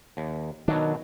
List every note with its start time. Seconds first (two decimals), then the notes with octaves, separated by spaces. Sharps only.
0.17 D#2
0.68 B2 D#3 F#3 D4